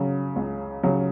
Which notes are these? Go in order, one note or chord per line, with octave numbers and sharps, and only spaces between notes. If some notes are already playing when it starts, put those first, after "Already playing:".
Already playing: C#3 F#3
C#2
C#3 F#3